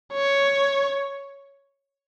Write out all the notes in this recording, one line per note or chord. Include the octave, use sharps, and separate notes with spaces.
C#5